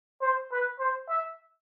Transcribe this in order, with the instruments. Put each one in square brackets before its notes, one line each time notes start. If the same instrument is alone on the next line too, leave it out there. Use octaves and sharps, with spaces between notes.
[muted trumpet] C5
B4
C5
E5